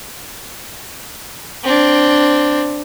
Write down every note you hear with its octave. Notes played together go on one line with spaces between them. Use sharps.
C4 D4